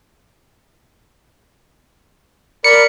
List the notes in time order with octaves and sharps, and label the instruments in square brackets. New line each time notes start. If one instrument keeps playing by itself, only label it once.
[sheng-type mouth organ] A#4 D5 B5 [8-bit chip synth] C#7